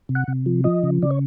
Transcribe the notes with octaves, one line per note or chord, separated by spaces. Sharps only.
C3
F#5
C3
F3
F3 D#5
C#3
C#3 D5
C#5